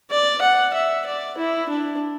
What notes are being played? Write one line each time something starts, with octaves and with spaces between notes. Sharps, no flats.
D5
F#5
E5
D5
E4
D4